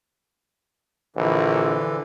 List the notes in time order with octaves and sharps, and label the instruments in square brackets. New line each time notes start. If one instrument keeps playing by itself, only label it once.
[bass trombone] A#1 [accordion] D3 E3